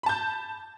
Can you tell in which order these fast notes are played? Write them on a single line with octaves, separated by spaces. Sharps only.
B5 A5 G6